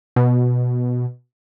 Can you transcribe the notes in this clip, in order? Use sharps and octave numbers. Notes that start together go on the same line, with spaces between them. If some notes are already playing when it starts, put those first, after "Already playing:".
B2